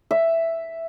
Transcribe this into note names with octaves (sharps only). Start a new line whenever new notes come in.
E5